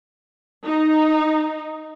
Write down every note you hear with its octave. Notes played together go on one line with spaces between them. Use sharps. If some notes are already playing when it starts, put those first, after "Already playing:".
D#4